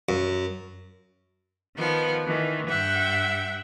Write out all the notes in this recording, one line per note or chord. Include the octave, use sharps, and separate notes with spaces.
F#2
D#3 F3 B3
D#3 E3
G2 E5 F#5 G5